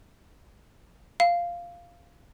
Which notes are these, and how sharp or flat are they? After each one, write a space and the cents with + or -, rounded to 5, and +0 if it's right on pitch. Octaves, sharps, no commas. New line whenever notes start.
F5 -5